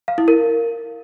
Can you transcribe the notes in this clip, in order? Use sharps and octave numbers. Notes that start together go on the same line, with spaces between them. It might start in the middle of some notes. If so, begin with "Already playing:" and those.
F5
E4
A#4